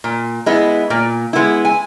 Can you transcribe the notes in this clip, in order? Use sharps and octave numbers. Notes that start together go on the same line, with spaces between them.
A#2
G#3 B3 E4
A#2
G#3 B3 E4
G#5